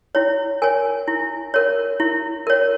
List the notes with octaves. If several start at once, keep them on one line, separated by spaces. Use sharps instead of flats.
E4 C#5
A#4 C#5 G#5
E4
A#4 C#5
E4
A#4 C#5